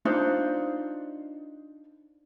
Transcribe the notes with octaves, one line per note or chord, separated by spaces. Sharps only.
D4 D#4 F4 C5